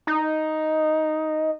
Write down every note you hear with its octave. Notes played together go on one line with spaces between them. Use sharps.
D#4